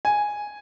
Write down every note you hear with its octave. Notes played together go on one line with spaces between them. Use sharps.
G#5